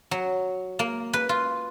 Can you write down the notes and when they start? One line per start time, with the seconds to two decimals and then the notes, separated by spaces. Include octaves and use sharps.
0.11 F#3
0.79 A#3
1.13 B4
1.29 F4